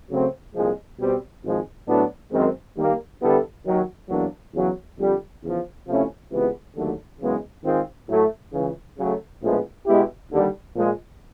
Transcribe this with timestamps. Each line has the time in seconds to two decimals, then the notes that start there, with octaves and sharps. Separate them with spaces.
0.10 C#3 F#3 A3 C4
0.55 C2 A#2 F3 G#3
0.99 B2 G3 C4
1.43 G#1 G#2 F3 G#3
1.88 A2 F#3 B3 D4
2.32 F#2 D#3 G#3 C4
2.76 D#3 G3 A#3
3.21 D3 G3 B3 E4 A4
3.65 D#2 D#3 F#3
4.09 E2 B2 F#3 A#3 D4
4.54 E2 C#3 F#3
4.98 F2 D3 G3
5.42 E2 C#3 F3
5.87 C3 F3 A3 C#4 E4
6.31 C#2 C3 E3 G#3 B3
6.76 D#2 D3 F#3 A3
7.20 F#2 C#3 E3 G#3 B3
7.64 D#3 G#3 C4 F4 G#4
8.09 A2 F#3 A3
8.53 C#2 C#3 E3
8.98 C#3 F#3 A3
9.42 A#1 A2 F3 G#3 B3
9.86 B2 G#3 B3 E4 G4
10.31 D#2 D3 G3
10.75 A#2 F3 G#3